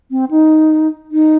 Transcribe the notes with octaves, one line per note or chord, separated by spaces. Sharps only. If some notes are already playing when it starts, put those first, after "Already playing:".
C4
D#4
D#4